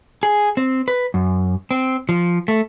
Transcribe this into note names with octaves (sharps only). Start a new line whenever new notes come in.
G#4
C4
B4
F#2
C4
F3
A3